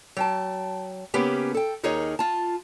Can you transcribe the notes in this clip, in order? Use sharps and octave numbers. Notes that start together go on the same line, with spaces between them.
F#3 G5 A5
C#3 A#3 B3 C#4 G4 B4
A4 G5
D#2 D#4 G#4 A#4 C#5 D#5
F4 A5